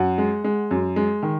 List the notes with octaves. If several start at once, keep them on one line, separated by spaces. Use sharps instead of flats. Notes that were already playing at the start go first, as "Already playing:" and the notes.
Already playing: F#2 F#5
G#3
G#3
F#2
G#3
D#3